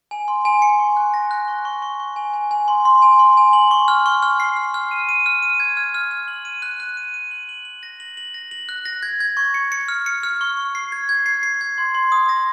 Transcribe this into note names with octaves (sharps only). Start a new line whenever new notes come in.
G#5
C6
G#5
C#7
C#6
F#6
A#6
F#6
C#6
C#6
C#6
C#6
G#5
G#5
G#5
C6
C6
G#5
C6
G#5
F#7
C#6
F6
C#6
F6
C7
F6
F6
D#7
D#7
F6
D#7
G#6
F6
F6
F6
F#7
D#7
F#6
F#6
D#7
D#7
F#7
F#7
F#7
A#6
F#7
F#7
A#6
F#7
F#6
A#6
G#6
G#6
C#6
C#7
C#7
F6
C#7
F6
C#6
C#6
C7
G#6
G#6
C7
C7
G#6
C6
C6
D#6
A#6